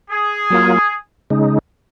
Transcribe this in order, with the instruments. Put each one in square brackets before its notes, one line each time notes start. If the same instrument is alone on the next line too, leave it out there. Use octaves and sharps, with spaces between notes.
[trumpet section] G#4
[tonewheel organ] F#3 A#3 F4
C#3 G#3 D#4